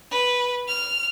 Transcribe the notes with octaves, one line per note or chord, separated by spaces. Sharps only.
B4
F6